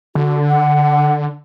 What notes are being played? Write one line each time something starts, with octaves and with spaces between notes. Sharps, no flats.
D3 F#4
F#5